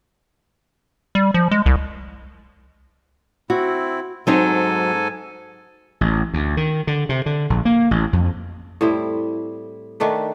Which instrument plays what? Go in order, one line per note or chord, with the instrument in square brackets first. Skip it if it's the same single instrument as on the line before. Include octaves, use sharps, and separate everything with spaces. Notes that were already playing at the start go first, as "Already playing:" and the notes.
[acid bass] G3
F3
G#3
C2
[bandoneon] C4 E4 [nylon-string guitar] F#4
[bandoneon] G#2 A4 G#5 [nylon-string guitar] F#3 C4 D#4
[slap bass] A1
D2
D#3
D3
C3
D3
A#1
A#3
A1
F2
[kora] A2 G3 C4 E4
D#3 A3 D4 B4